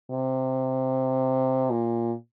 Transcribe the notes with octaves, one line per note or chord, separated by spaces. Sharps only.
C3
A#2